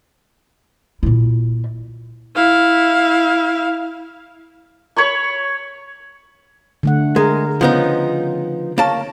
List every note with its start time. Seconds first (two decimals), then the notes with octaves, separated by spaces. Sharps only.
1.03 A#2 E4
2.35 E4 F5
4.96 C#5 B5 C#6
6.83 D3 A3 F#5
7.16 G#3 A#4
7.61 C#3 F3 B3 C#4 D#4
8.78 A#3 C#5 A5